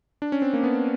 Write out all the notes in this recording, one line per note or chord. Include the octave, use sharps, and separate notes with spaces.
D4
C#4
C4
A#3
B3